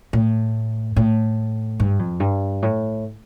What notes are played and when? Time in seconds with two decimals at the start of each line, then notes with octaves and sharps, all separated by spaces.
0.13 A2
0.96 A2
1.80 G2
1.99 F2
2.20 G2
2.63 A2